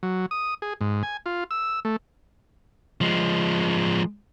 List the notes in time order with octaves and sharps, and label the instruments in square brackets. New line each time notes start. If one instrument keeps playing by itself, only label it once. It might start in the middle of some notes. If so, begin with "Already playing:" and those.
[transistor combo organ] F#3
D#6
G#4
G#2
G#5
F4
E6
A3
[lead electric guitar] F3 G#3